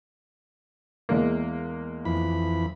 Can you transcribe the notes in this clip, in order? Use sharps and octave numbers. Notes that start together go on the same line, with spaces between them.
E2 G#3 A#3
F2 E3 B5